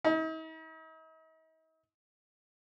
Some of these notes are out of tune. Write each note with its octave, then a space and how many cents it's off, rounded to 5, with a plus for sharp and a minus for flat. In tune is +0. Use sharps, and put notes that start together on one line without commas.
D#4 +45